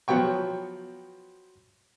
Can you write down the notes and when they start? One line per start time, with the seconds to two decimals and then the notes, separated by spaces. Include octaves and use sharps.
0.08 F3 F#3 B3 G5 C#6